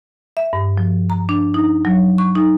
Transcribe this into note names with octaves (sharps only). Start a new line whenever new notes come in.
E5
G2
F3
A#5
D4
D#4
F#3
C#6
D#4